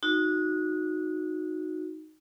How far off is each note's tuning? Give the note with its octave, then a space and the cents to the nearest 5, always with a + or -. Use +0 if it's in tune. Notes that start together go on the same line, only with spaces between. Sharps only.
D#4 +0 F#4 -20